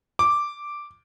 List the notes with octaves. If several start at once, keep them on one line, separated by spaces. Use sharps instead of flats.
D6